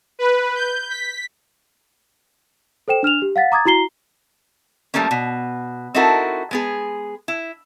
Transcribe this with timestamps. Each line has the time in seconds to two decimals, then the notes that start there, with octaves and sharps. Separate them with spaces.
0.19 B4
0.55 G6
0.89 B6
2.88 A4 C5 G5 E7
3.03 D4 F6 E7 F7
3.22 G4
3.36 F5 F#5 A6 B6
3.52 A#5 D6 D#6 G#6 A6
3.65 E4 F#4 A#5 C7 G7
4.94 F3 G3 A3 A#3 C#4
5.11 B2
5.94 C4 D#4 E4 F#4 A4 A#4
6.51 G#3 B3 G#4
7.28 E4